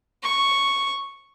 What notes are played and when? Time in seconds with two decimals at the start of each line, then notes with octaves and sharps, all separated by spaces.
0.23 C#6